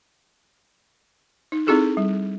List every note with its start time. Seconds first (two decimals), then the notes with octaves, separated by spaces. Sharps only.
1.52 D#4
1.67 C4 D#4 E4 F#4 G#4 A4
1.97 G3